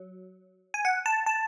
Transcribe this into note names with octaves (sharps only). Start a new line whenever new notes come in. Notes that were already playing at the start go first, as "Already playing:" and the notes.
Already playing: F#3
G#5
F#5
A5
A5